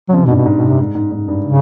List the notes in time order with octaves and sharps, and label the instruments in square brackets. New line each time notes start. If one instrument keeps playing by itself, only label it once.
[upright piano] C#3 [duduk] F#3
[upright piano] C3 [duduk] F3
[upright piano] G#2 [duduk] B2
[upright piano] G2
[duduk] B2
[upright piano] G#2
[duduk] B2
[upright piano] G2 [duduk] C3
[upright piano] G#2
G#2
G#2
G2
[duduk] C#3